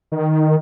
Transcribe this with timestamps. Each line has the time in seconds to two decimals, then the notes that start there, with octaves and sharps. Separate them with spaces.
0.12 D#3